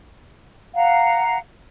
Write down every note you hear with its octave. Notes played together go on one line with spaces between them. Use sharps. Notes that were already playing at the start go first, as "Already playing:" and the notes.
F5 F#5 A#5